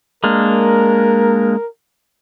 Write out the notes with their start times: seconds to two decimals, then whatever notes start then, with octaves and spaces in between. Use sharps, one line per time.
0.24 G#3 A#3 D4 A#4